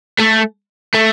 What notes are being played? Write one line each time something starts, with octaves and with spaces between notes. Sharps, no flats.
A3
A3